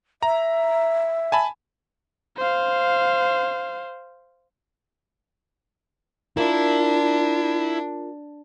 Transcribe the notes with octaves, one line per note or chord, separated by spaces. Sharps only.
E5 A#5
G#5 A5 B5
C5 F5
D4 E4 F4 A#4